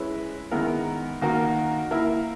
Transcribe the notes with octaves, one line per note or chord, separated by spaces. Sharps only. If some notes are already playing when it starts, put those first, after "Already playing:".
Already playing: G#3 C#4 E4 B4
D#3 G#3 B3 E4 A#4
D#3 A#3 D#4 F#4 A#4
A#3 E4 A#4